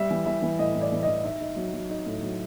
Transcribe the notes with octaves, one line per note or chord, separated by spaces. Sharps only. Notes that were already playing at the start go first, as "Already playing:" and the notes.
Already playing: G3 E5
E3
E3 E5
E3
A2 D#5
A2
D5
E3
E3 D#5
D#4 E5
D#4
F#3
F#3
D#4
A2
F#3